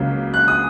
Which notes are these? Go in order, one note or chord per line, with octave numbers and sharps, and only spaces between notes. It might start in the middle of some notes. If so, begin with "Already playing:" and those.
Already playing: C#2 C#3 F#3 A#3
F#6
D#6